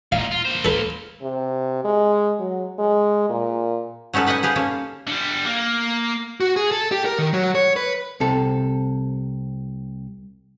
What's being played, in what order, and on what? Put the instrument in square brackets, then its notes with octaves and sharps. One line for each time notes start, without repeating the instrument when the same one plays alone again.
[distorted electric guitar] A#2 D#4 [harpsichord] F5
[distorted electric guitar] F4
A#3 C5
[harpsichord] A4 B4
[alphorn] C3
G#3
F#3
G#3
A#2
[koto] F#3 C#4 D#4 A4 B4
G3 B4 D#5 F#5 G#5
G4 G#4 B4 F5
A#3 C#4 A4
[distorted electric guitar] D3 G3
A#3
[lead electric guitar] F#4
G#4
A4
G4
A#4
D#3
F#3
C#5
B4
[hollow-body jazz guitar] C2 C3 A4